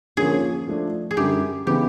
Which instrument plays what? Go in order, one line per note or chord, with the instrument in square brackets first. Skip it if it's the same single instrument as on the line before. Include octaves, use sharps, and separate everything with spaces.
[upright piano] D3 F3 A#3 C#4 [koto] G#4
[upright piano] F3 A3 D4
[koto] G#4
[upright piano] F#2 D3 G3 [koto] G4
[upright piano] C#3 E3 G#3 B3 D#4 [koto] G4